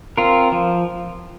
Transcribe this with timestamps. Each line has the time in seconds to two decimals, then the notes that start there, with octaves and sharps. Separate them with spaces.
0.18 C4 F4 A#4
0.52 F3